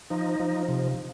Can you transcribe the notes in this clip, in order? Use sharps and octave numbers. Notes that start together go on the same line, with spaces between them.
F3 D#4
F3
C3